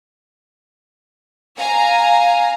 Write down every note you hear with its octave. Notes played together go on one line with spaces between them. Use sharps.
F5 G#5 A#5